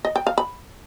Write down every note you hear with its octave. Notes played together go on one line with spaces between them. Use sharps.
D#5
G5
F5
B5